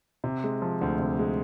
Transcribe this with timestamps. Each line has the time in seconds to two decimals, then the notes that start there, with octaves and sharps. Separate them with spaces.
0.24 C3
0.44 G#3
0.62 F3
0.81 D2
0.99 C3
1.19 G#3